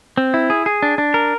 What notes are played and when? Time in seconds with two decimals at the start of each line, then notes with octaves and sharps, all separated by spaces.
0.17 C4
0.34 E4
0.50 G#4
0.66 G#4
0.82 D4
0.98 D4
1.14 A#4